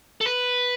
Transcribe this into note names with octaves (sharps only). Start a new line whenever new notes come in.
A4
B4